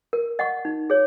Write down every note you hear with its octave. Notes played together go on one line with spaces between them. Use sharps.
A#4
D#5 F#5 C#6
D#4
G#4 C#5